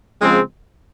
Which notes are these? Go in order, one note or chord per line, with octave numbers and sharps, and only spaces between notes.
C#3 F3 G#3 C4